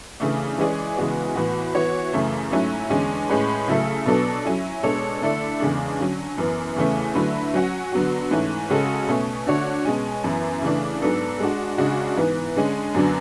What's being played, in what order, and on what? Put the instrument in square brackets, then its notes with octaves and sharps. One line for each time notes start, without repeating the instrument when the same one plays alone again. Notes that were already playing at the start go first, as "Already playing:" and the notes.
[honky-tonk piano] C#3 E3 A3 D4
E3 G#3 C#4 G#4 D5
C#3 E3 G#3 B3 F#4
A2 E3 B3 F#4
E3 B3 F#4 C#5
F#2 C#3 E3 A3
G#2 F#3 A3 C#4 E4
E2 D3 G#3 C#4
A2 G#3 C#4 G#4 B4
C#3 F#3 A3 E4 A4
B2 F#3 B3 D4 A4
F#3 C#4 E4
B2 G#3 D4 A4 C#5
D3 A3 E4 A4 D5
E2 C#3 G#3 D4
D3 F#3 C#4
F#2 E3 B3
E2 C#3 E3 A3 C#4
D3 F#3 A3 E4 B4
F#3 C#4 F#4
D3 F#3 B3 F#4
G#2 E3 A3 C#4
C#3 G#3 C#4 F#4 A4
B2 A3 C#4
D3 A3 D4 F#4 C#5
B2 G#3 C#4
F#2 E3 B3 E4
C#3 E3 A3 D4
G#2 F#3 B3 D4 A4
G#3 D4 F#4
C#3 G#3 D4 F#4
G#2 E3 B3
D3 G#3 C#4
F#2 D3 F#3 B3 D4